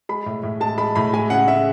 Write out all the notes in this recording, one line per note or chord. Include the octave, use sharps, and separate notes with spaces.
G#3 B5
A2
A2
G#3 A5
G#3 B5
A2 B5
G#3 G#5
C#3 F#5
C#3 E5